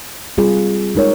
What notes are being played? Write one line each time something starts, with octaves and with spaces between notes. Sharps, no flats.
G3 C4 F4 G#4
G#3 D#4 A#4 C#5